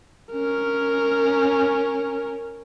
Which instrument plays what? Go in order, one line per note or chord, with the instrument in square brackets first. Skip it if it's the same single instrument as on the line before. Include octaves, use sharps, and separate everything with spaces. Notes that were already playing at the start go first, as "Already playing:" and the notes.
[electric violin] C#4 A#4